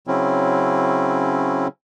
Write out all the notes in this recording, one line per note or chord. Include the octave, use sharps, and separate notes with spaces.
C#3 F#3 C4 C#4 E4